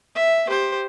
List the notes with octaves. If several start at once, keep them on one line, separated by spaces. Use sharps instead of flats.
E5
G4 C5